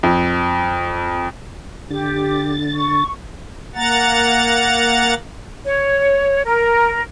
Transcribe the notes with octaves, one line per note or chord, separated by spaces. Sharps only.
F2
D3 G4 A6
C#6
A#3 F#5 A#5 A6
C#5
A#4